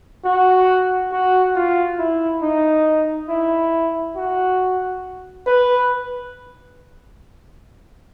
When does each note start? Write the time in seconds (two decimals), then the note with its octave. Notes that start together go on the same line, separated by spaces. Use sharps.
0.25 F#4
1.12 F#4
1.56 F4
1.99 E4
2.42 D#4
3.29 E4
4.16 F#4
5.46 B4